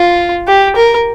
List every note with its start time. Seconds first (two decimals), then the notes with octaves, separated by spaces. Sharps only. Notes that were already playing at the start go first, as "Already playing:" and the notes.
Already playing: F4
0.48 G4
0.76 A#4